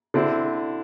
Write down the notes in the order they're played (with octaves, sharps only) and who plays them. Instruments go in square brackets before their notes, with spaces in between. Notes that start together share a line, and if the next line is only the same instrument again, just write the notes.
[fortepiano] D3 C4 E4